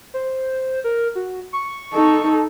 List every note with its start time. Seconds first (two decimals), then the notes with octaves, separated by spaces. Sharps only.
0.14 C5
0.84 A#4
1.15 F#4
1.53 C#6
1.93 D#4 A4